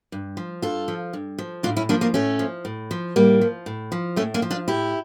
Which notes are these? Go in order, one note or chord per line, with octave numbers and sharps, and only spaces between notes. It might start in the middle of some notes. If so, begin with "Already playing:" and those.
G2
F3
G2 F4 A4
F3
G2
F3
A2 D4 F4
C#4 E4
F3 A#3 D4
A#3 D4
A2 A3 C#4
F3
A2
F3
A2 G3 A#3
F3
A2
F3
A2 A3 C#4
A#3 D4
F3
D4 F4
A2 E4 G4